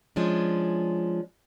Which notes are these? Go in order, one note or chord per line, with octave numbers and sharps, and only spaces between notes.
F3 G#3 C#4 D4